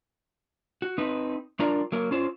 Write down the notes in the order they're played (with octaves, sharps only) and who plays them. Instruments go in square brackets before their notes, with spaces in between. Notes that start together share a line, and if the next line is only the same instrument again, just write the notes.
[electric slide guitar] F#4
C4 D#4 B4
G3 D4 F4 A#4 D5 A#5
F#3 A#3 A#4
C#4 F4 C5